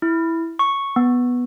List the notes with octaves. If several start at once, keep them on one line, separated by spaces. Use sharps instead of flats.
E4
C#6
B3